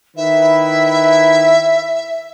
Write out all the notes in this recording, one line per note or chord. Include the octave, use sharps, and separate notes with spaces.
D#3 E4 B4 E5